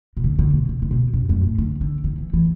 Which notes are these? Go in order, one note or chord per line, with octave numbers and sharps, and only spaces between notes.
B2
D3
D3
B2
D3
D3
B2
F#2
F#2
A2
D3
D3
D3
E3
E3